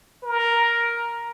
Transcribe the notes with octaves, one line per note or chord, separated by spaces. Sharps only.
A#4